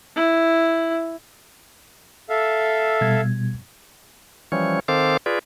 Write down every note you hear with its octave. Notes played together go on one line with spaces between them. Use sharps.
E4
A4 E5 F5
B2 G3 G#6
E3 F3 G3 C#4 C#5
D#3 C4 A4 C5 F5 D6
F4 G#4 B4 D5